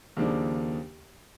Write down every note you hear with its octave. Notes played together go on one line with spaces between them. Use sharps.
D#2 C#3 F3 A#3 D4